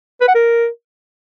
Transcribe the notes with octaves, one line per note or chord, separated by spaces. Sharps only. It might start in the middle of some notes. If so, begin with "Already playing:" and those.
B4
F#5
A#4